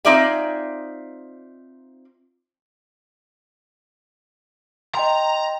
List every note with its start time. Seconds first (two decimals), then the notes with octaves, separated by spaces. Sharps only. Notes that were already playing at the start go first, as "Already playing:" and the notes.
0.05 C4 D#4 F4 D5 E5 G#5
4.95 D#5 G5 A#5 C6